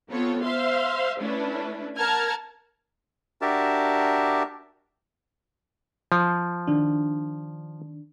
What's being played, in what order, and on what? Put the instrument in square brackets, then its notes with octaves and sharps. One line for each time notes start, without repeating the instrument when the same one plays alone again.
[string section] B3 C4 F4 A4 C#5
C5 E5 F5 C6
A3 C#4 D4 E4 B4
A#4 F#5 A5 A#5 F6 G#6
[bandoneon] D4 F#4 G4 A#4 E5 A5
[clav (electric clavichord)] F3
[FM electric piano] D#3 D4